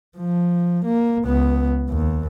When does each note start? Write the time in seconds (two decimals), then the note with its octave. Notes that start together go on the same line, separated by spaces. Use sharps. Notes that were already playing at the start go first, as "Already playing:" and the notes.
0.18 F3
0.85 A#3
1.25 C#2 B3
1.89 D#2